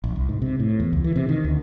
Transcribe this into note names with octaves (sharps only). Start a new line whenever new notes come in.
A#1
C2
G#2
C3
A2
E2
C#2
E3
C3
D#3
D2